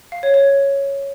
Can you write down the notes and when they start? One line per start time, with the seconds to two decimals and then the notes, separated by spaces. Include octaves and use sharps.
0.12 F5
0.23 C#5
0.34 C#5